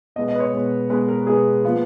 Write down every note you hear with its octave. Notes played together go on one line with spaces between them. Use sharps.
B2 G#3 B3 D#5
D#5
B4
C#5
B2 G#3 B3
B2 G#3 B3 B4
A#4
B2 G#3 B3 G#4
A#2 F3 B3